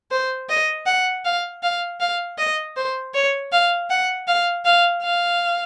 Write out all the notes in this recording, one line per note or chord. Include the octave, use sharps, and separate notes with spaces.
C5
D#5
F#5
F5
F5
F5
D#5
C5
C#5
F5
F#5
F5
F5
F5